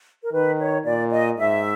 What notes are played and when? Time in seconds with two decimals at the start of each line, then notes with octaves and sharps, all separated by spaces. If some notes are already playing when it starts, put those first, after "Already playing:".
0.23 A#4
0.33 D#3 B4
0.60 C#5
0.86 A#2 D5
1.11 D#5
1.38 G#2 E5